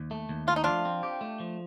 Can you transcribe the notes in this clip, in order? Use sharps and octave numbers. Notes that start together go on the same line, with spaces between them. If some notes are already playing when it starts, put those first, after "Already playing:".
Already playing: D#2
A3
D#2
A3 F4
D#4
F3 D4 F4
C4
G4
A3
F3